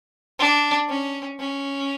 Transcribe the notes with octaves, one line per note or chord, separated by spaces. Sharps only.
D4
C#4
C#4